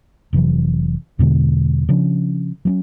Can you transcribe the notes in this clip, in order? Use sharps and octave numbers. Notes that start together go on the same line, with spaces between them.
F1 C3 E3 F#3
E2 B2 D3 G#3
C#3 F3 C#4 D4
F#3 C4 C#4